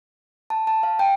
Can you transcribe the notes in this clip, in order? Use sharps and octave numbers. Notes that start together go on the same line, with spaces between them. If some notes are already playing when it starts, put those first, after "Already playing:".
A5
A5
F5
G5